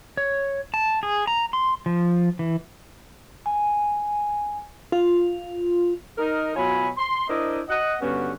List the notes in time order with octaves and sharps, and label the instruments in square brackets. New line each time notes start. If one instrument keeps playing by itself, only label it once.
[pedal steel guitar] C#5
A5
G#4
A#5
C6
F3
E3
[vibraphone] G#5
[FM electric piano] F4
[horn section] D#4 A#4 D#5
B2 F#3 F4 C#5 G#5 B5
C6
D4 E4 A#4 C5 D#5
D#5 F#5
G2 D3 B3 C#4 F#4